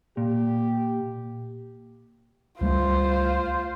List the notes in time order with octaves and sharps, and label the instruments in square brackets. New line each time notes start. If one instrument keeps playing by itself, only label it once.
[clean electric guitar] A#2 [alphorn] G4
[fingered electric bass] C#2 G3 A3 [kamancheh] F4 C5